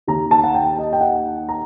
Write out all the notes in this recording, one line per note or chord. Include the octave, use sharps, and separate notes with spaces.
D#2 D#3 A#5
A5
F#5
G5
D#5
G5
F#5
A#5